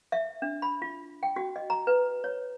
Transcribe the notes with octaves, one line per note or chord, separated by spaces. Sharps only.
E5
D4
B5
F4
G5
F#4
D#5
A#5
B4
C#5